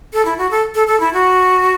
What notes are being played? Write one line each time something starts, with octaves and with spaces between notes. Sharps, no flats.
A4
E4
F#4
A4
A4
A4
E4
F#4